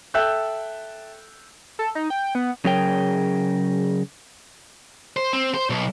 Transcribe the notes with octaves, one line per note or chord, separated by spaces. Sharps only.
A4 E5 G5 E6 F#6 G6
A4
D#4
G5
B3
C#3 F#3 G#4 A#4 C#5 G5
C5
C4
C5
B1